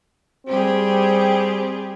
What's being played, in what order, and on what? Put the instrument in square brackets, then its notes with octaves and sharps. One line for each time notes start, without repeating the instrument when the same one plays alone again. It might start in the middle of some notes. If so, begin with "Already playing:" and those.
[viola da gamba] G3 G4 G#4 [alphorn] C4